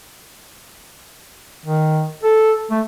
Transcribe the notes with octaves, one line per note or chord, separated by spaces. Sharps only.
D#3
A4
A3